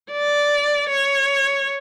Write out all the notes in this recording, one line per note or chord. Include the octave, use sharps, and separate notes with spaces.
D5
C#5